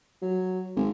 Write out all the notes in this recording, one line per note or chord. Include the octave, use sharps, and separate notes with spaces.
F#3
G#1